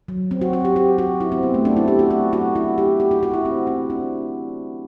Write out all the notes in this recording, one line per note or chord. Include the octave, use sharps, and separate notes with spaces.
F#3
C4
F#4
F#4
G4
G4
F#4
E4
C4
B3
A3
D4
E4
G4
F#4
F#4
F#4
E4
G4
G4
F#4
F#4
E4
C4
E4
D4